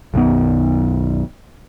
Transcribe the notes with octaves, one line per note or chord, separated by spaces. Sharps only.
B1 F#2 D#3 B3